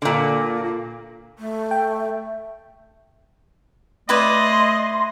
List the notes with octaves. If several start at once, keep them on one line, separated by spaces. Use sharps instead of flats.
A#2 D3
A3
G5
A3 E4 B4 D5 D#5 C6